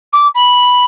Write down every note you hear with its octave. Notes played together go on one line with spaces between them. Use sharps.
D6
B5